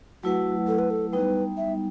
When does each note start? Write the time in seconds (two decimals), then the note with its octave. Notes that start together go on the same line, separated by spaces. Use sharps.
0.23 F#3 A3 E4 F#4 B4 F#5
0.67 A4
0.79 B4
0.90 A4
1.12 G3 B3 D#4 B4
1.57 E5